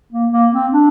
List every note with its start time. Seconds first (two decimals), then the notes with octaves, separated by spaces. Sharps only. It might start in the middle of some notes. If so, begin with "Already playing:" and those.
0.13 A#3
0.32 A#3
0.53 C4
0.72 D4